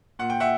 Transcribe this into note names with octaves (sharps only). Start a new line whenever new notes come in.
A#2 F#5
G5
E5 F#5